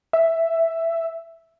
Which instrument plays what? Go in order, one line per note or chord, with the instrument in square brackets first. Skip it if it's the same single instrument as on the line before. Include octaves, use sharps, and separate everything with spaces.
[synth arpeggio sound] E5